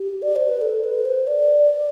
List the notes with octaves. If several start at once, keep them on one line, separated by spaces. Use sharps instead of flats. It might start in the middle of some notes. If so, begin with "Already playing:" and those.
Already playing: G4
D5
C5
B4
A4
B4
C5
D5